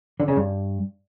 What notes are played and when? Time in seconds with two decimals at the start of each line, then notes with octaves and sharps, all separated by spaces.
0.20 D3
0.28 C#3
0.36 G2